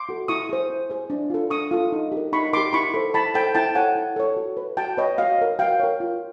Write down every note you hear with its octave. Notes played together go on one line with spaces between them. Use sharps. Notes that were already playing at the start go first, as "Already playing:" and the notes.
Already playing: C6 D6
F#4 A4
E4 C#6 D#6
G#4 C5
E4
G#4 C5
D4
F4 A4
D4 C#6 D#6
F4 A4
D#4
G4
A#4
D#4 B5 C#6
G4 A#4 C6 D6
E4 B5 C#6
A4 C5
E4 A5 B5
A4 C5 G5 A5
E4 G5 A5
A4 C#5 F#5 G#5
E4
A4 C#5
F#4
B4
F#4 G5 A5
B4 C#5 D#5
F#4 D#5 F5
A#4 C#5
F#4 F5 G5
A#4 C#5
F4